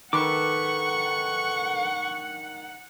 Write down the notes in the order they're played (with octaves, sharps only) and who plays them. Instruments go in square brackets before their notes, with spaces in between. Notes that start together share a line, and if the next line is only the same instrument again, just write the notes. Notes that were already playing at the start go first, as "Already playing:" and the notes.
[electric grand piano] D#3 [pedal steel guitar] A4 B4 D6 [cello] F#5 [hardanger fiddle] C#6